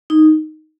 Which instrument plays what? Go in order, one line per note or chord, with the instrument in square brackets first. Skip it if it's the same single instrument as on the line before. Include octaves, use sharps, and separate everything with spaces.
[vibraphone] D#4